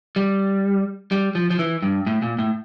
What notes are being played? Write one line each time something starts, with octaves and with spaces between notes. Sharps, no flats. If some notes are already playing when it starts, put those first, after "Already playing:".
G3
G3
F3
F3
E3
G2
A2
A#2
A2